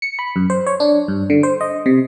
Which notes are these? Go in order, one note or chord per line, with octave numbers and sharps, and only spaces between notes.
C#7
B5
F#2
C5
C#5
D4
G2
D3
C5
D#5
C3